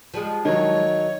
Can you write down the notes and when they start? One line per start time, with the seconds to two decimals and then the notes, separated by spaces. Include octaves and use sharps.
0.14 F3 G3 G#3
0.45 D#3 F#3 C#5 D#5